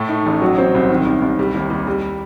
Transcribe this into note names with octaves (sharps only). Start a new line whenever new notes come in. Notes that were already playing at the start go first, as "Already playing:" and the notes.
Already playing: A2 A3
D#4
A1
F#3
C4
C2
D#3
C2
C2
G3
D#2
D#2
G3